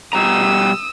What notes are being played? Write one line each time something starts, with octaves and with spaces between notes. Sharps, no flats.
B2 G3 A#5 D#6 E6